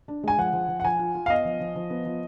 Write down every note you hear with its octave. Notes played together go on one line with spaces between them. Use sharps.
D4
G#3 G#5
F3 F#5
F3
F3
F#5
F3 G#5
F4
F4
F5
B3 D#5
F3
F3
F3
B3
F3